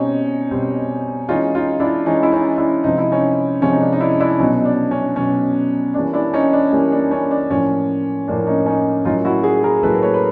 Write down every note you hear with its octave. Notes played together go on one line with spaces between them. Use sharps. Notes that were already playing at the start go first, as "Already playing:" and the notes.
Already playing: B2 G3 C4 C#4 D#4
B2 G3 C4
E3 G#3 C#4 D#4 F4
D#4 F4
D4 E4
E3 G#3 C#4 D#4
E4
C#4 D#4
D4 E4
C3 F3 G#3 C4 D#4
E4
C#4 D#4
C3 F3 G#3 C4 C#4
D#4
D4
D#4
D4 E4
D4 E4
B2 F#3 B3 C#4 D#4
D4
C#4
B2 F#3 B3 C#4
E3 G3 A#3 C#4 D4
D4 E4
C#4 D#4
D4
E3 G3 A#3 C#4 D4
D4
C#4
D4
A2 F3 A#3 C#4
A2 F3 A#3 C#4 D4
C#4 D#4
C#4 D#4
A2 F#3 A#3 C#4 D#4 F4
E4 F#4
F#4 G#4
G#4 A#4
A2 F#3 A#3 C#4 A4 B4
B4 C#5
B4